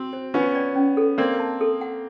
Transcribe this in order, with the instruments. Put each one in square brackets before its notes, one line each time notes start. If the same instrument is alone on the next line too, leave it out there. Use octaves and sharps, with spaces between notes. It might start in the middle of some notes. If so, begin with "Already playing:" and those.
Already playing: [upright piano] C4 [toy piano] F#4
[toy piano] C5
[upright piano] B3 C#4 [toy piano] F4
[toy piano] D5
C#4
A4
[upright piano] A#3 C4 [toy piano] D5
[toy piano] A5
A4
F#5